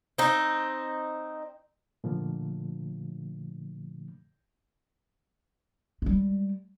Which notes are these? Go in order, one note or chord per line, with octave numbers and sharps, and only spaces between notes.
C4 D#4
A#2 D3 F3 A3
G3 G#3